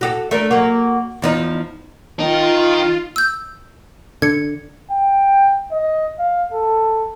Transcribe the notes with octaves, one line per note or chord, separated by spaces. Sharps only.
F#4 G4 A4
A3 D4 A#4
F#3 A#3
E2 F3 D#4
D#3 D#4 F4
E6 G6
D3 G#6 C#7
G5
D#5
F5
A4